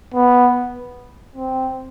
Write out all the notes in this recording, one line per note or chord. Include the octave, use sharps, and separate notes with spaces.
B3
C4